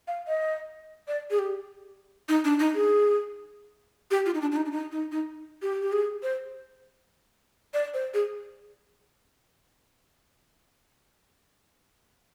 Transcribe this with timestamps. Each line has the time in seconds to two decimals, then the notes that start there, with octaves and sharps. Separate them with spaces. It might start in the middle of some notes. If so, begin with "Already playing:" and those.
0.08 F5
0.28 D#5
1.08 D5
1.31 G#4
1.39 G4
2.29 D#4
2.45 D4
2.59 D#4
2.75 G#4
4.11 G4
4.26 F4
4.34 D#4
4.41 D4
4.52 D4
4.56 D#4
4.66 D4
4.71 D#4
4.92 D#4
5.12 D#4
5.62 G4
5.82 G4
5.93 G#4
6.23 C5
7.74 D5
7.94 C5
8.14 G#4